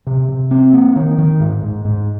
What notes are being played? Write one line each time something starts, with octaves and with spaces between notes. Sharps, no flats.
C3
C3
C4
A#3
D#3
D#3
G#2
G#2
G#2